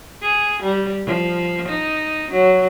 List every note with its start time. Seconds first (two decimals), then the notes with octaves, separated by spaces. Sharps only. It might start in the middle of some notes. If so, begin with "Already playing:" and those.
0.22 G#4
0.63 G3
1.06 F3
1.69 D#4
2.31 F#3